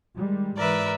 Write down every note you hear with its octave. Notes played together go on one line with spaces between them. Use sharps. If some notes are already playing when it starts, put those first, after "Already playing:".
D#3 G3 G#3
G#2 E3 G#3 A#4 B4 D5 E5